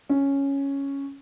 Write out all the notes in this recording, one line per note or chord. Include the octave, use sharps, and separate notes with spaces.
C#4